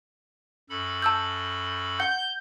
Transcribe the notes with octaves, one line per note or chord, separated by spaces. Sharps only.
F#2 A4 B5
A5 E6 G6
F#5 G6